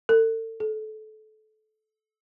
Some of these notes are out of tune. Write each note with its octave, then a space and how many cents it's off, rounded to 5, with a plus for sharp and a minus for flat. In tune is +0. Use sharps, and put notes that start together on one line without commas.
A4 +35
A4 -25